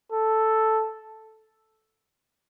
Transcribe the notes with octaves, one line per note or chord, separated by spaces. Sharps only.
A4